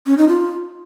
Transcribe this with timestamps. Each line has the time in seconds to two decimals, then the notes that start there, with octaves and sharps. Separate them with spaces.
0.06 C#4
0.18 D#4
0.29 F4